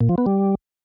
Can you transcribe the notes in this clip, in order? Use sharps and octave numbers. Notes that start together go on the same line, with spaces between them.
A#2
F3
B3
G3